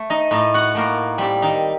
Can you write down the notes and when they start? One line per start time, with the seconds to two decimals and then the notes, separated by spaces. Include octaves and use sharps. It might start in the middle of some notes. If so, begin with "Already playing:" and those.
Already playing: A3
0.10 D#4 D#5
0.31 A2 D#4 D#5
0.54 F#4 F#5
0.75 A2 A#3 A#4
1.18 G3 C4 G4
1.42 D#3 D#4